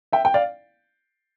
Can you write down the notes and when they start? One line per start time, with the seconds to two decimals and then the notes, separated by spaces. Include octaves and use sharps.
0.13 E5 G5
0.25 G5
0.34 D5 F5